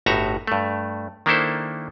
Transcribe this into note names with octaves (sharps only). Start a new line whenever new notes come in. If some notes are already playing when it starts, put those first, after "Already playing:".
G1 A2 D#4 F#4 E5 A#5
G2 A3
D#3 A#3 D4 E4 A4 C5